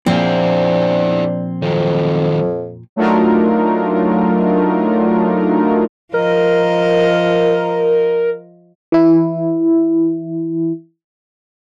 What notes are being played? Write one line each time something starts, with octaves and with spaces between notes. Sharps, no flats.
A#2 F3 C4 D4 E4 G#4 F5
F2 D#3 F#3
F#3 A3 D4 D#4 F4 A#4
F3 A#4 D#5
E3 E4